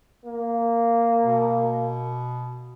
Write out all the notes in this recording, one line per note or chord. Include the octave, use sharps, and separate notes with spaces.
A#3
B2